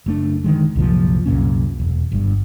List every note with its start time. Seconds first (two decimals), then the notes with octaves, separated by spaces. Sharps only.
0.06 F#1 A3 D4
0.44 D3 D#3 G#3
0.76 C2 F#2 A#2 F3
1.26 C2 F#2 A#2 C#4
1.80 E1
2.12 G1 G2